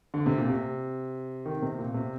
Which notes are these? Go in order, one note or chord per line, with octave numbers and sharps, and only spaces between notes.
D3
C3
A#2
C3
D#3
C3
A#2
C3